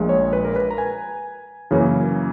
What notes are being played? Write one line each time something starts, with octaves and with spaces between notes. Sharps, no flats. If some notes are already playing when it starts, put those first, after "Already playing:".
Already playing: A#1 A#2 G#3
C#5
B4
A#4
B4
A#5
G#5
F#2 C#3 E3 A#3 C#4